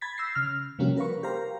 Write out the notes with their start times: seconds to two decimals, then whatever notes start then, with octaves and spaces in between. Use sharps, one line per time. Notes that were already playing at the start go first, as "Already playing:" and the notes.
0.01 B5 G#6 A6 B6
0.18 E6 G6 A#6 C7
0.35 C#3 F6
0.79 C3 F3 G3 A#3 C#4 F#4
0.96 F#4 A#4 B4 F5 C#6
1.23 G4 A#4 C5 F5 A#5